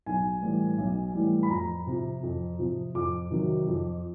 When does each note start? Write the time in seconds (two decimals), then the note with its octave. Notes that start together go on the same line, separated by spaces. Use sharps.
0.06 B1 G#5
0.41 A2 E3 G3
0.78 B1
1.14 A2 E3 G3
1.43 B5
1.50 F2 A#5
1.87 C3 F3
2.23 F2
2.59 C3 F3
2.95 F2 D6
3.30 C3 D#3 F#3
3.68 F2